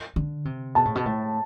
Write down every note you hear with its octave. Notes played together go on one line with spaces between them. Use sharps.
D3
C3
B2 A5
A2
B2
A2